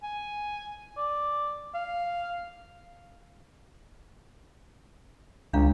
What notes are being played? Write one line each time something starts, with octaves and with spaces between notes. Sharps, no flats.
G#5
D5
F5
C#2 D4 F5 A#5